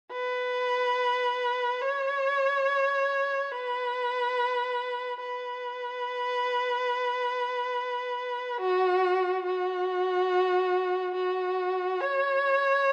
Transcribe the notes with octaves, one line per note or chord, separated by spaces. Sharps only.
B4
C#5
B4
B4
F#4
F#4
F#4
C#5